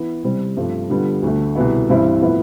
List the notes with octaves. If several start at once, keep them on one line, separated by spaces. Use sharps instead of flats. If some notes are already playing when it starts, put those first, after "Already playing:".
Already playing: E3 B3 E4
C3 G3 C4
G2 F3 A3 C4
D3 G3 B3 F4
D2 D3 A3
C2 B2 B3 E4
G2 E3 G3 C4 E4
A2 F3 B3 E4